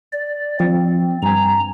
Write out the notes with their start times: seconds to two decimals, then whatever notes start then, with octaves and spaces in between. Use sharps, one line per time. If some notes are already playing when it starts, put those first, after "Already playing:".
0.12 D5
0.60 F3 C4
1.22 G2 G#5 A#5